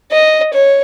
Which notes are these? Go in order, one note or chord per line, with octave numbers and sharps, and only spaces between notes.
D#5
C#5